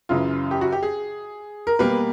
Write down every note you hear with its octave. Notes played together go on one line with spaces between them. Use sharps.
F#2 C#3 E3 F4
G4
F#4
G4
G#4
A#4
B2 G3 A#3 B4